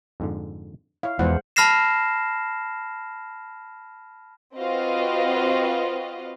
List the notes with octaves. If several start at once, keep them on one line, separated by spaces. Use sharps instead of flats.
F2 G#2 D3
E4 C#5 F5
E2 G#2 B2 F3 G#3 C5 F#5
A5 B5 F6 A#6 C7 E7
C4 F4 F#4 B4 D#5 F5